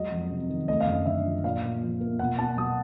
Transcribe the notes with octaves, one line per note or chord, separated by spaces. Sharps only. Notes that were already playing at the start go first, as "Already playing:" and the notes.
Already playing: F#3 G#3 D#5
F2
C3
D#3
A3 D#5
F5
F#2
D#5
D3 E5
F3
A#2 F5
A#2
F3
A#3
B2 F#5
B2 A5
F#3 D#6